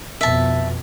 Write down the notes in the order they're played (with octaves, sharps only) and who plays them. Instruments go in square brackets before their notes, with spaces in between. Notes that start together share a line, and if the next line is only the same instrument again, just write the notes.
[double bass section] F2 B2 [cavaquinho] E5 A5